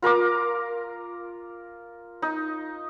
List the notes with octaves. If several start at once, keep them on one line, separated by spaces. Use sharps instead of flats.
F4 A#4 A#5 D6
D#4